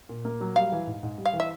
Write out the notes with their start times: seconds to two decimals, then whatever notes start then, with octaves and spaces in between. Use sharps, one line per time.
0.09 A#2
0.25 A#3
0.41 F#3
0.56 G3 F5
0.72 E3
0.87 G#2
1.03 G#2
1.18 G3
1.25 F5
1.33 E3
1.40 E5